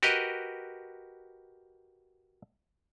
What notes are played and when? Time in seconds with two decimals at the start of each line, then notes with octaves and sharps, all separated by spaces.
0.03 F#4 G4 A#4 B4 D#5